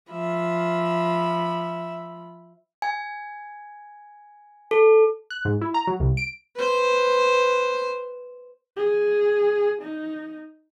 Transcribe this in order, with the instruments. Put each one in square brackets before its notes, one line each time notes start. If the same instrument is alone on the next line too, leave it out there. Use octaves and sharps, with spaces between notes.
[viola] F3 B5 [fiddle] E5
[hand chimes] G#5
A4
[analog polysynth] F#6
G#2
E4
A#5
F#3
C2
D7
[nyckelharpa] B4 C5
[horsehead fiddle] G#4
D#4